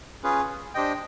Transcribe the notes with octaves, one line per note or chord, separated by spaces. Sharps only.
C#4 F4 G#4 B4
D4 G4 C5 D#5 G5